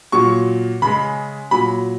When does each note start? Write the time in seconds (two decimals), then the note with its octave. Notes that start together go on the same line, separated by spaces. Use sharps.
0.12 A#2 F#3 C#6
0.82 C#3 G#3 B5
1.51 A#2 F#3 B5